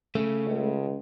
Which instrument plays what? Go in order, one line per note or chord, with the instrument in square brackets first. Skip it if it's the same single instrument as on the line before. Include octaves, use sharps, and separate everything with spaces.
[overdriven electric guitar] C#3 [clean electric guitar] A3
[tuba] C#2